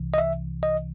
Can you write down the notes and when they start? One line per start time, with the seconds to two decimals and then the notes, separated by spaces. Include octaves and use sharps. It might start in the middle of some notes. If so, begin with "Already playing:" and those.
Already playing: C2 C3 E3
0.14 D#5
0.18 E5
0.63 D#5